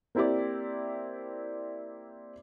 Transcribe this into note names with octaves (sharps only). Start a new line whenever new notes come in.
A#3 C4 E4 G4 D5